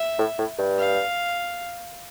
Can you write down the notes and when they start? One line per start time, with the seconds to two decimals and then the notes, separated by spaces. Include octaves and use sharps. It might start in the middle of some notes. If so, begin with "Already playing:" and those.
Already playing: E5
0.19 A2
0.39 A2
0.58 G2
0.78 F5